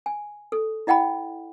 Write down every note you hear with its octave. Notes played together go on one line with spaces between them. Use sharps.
G#5
A4
E4 D#5 F#5 G5 B5